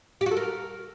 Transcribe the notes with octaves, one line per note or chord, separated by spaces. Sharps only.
G4
F#4
A4
A#4